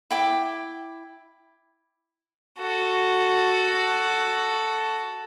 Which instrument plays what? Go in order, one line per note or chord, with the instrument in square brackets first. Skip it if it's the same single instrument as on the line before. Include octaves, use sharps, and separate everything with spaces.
[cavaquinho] E4 G5 D6
[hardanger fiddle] F#4 A4